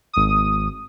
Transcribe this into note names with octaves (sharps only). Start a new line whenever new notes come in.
G#1 D#6